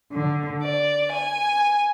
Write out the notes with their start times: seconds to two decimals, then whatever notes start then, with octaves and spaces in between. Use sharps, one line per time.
0.12 D3
0.63 D5
1.12 G#5